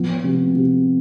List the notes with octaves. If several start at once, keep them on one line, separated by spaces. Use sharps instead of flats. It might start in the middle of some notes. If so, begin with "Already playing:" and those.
Already playing: F3 B3
C3
C3